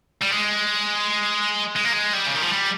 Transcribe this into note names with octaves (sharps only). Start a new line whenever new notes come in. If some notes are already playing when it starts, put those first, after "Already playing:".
G3
G#3
G#3
A#3
G#3
G3
C#3
D#3
F3
G3